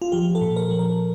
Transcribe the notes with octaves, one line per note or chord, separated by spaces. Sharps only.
F4
F3 G4
A4
A#2
A#4
F3
A#4